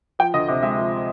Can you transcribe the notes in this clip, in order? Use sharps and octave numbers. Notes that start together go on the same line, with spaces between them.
F3 G5
D2 D#5
C3 D#5
G#3 E5
F3